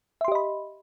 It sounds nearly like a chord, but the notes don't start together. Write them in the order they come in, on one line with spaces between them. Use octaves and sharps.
E5 C6 G4 D#5 B5